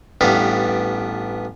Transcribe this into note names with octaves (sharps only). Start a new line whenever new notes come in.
A1 G3 B3 D4 F5